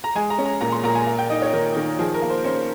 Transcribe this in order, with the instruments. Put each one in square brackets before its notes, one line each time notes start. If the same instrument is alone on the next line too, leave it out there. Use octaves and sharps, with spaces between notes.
[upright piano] A#5
G#3 G#5
A#5
C#4
A#5
A#2 A#5
C6
A#2 A#5
G#5
A#3
G5
D#4 D#5
C#5
D#3 A#4
D#3
F3 G#4
A#4
A#3
C5
C#4 C5